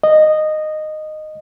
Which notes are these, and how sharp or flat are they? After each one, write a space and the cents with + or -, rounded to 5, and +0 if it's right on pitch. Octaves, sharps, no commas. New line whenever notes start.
D#5 -15